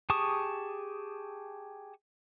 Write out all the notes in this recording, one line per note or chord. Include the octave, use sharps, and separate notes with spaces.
G4 G#4 A5 C#6 D#6